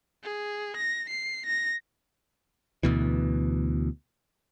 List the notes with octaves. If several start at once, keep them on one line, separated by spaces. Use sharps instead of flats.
G#4
A#6
C7
A#6
D2 B2 E3